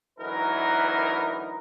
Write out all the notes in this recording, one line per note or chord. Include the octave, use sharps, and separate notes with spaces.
D2 E3 F#3 D#4 A#4 B4